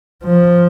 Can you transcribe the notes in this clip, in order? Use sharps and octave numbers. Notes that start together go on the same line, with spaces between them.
F3